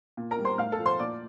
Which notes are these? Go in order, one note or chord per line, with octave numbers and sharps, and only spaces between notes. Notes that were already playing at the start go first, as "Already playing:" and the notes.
A#2
A#4 A#5
G3
C5 C6
A2 F5 F6
A4 A5
F3
C5 C6
A#2 D5 D6